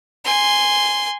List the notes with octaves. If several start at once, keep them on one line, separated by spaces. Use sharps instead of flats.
G#5 C6